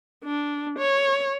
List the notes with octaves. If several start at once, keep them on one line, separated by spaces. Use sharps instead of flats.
D4
C#5